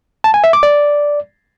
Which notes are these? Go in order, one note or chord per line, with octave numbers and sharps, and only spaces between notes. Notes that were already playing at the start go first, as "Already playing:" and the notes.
A5
G#5
E5
D6
D5